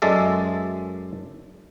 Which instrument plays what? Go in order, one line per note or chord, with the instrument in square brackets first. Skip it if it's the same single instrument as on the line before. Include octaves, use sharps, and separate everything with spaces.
[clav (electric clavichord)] F#2 G#3 A4 D5 E5